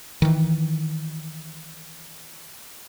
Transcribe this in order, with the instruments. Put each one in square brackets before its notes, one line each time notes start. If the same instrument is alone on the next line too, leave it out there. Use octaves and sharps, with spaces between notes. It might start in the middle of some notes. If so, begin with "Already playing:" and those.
[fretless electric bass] D#3 E3